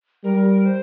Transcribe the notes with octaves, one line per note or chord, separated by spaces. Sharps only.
G3 A#4
C5